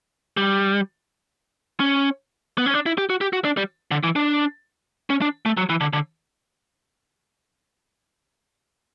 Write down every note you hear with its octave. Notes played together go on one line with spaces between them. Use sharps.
G3
C#4
B3
C#4
D4
E4
G4
F#4
G4
F#4
D4
G3
D3
E3
D4
C#4
D4
A3
F#3
E3
D3
D3